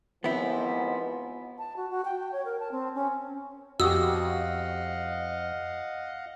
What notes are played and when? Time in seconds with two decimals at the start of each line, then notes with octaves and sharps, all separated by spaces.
0.24 D#2 G#2 F3 B3 C4 E4
1.58 A5
1.76 F#4
1.90 F#4
2.05 G5
2.19 G5
2.32 C#5
2.45 A#4
2.60 A5
2.71 C4
2.95 C#4
3.80 F2 F#4 G4 D#5 F5 F#5 D#6 E6